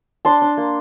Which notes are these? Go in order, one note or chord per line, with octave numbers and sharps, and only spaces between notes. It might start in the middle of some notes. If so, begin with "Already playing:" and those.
D4 A5 C6
D4
A#3